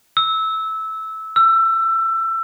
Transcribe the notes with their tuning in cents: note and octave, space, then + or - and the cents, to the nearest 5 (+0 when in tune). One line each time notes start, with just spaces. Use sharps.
E6 -15
E6 +25